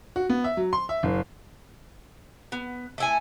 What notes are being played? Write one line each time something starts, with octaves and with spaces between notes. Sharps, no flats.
F#4
B3
E5
F#3
C6
E5
F#1
B3
A3 E4 G#5